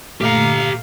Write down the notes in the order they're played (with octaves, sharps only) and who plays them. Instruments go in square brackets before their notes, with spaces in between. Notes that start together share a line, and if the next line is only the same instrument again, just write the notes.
[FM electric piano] A#2 A3 [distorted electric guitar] G4 A#5 [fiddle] F5